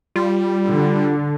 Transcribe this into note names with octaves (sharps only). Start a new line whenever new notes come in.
G3 F4
D3